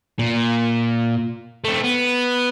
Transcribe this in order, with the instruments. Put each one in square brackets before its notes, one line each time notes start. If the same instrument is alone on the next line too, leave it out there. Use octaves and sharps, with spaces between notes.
[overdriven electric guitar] A#2
A3 C4
B3